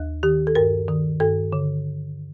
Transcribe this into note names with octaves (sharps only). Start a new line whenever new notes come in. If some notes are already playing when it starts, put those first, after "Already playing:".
Already playing: D#2
D#3 G4
A4
G2 A#4
D#3
G2 A4
D3